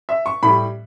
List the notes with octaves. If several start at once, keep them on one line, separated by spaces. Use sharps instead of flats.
E5
C#6
A2 G3 B5